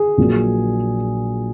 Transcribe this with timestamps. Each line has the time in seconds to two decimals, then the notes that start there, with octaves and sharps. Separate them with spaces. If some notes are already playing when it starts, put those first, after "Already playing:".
Already playing: G#4
0.18 A#1 A#2 F#3 A#3